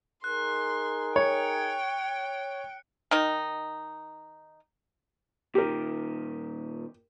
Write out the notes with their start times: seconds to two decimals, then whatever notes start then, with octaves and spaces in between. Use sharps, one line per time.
0.24 D#4 G#4 A#4 C6 F#6
1.16 C#5 G5 C#7
3.11 D#3 D#4
5.55 A#2 D#3 G4 A#4